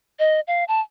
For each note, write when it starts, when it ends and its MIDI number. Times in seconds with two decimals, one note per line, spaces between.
0.19 0.40 75
0.47 0.64 77
0.68 0.81 81